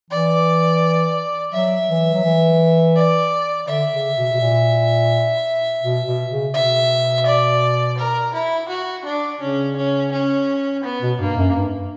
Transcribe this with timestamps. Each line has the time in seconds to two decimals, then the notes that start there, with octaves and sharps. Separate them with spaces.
0.10 E3 D5
1.53 F#3 E5
1.90 E3
2.14 F#3
2.25 E3
2.96 D5
3.67 D3 E5
3.92 C#3
4.16 B2
4.33 B2
4.40 A#2
5.83 B2
6.07 B2
6.31 C#3
6.54 B2 E5
7.26 D5
7.98 A#4
8.33 E4
8.68 F#4
9.04 D4
9.41 C#3 C#4
9.76 C#4
10.12 C#4
10.83 B3
11.02 B2
11.20 G2 A#3
11.37 F#2
11.56 G2